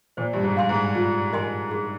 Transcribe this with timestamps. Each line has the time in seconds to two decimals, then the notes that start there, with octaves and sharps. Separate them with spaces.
0.17 A#2 C5
0.33 G2
0.43 G#2
0.57 F5 G#5 C6
0.69 G#2
0.95 F4
1.33 A#4 D#5 G#5 C6
1.71 G#4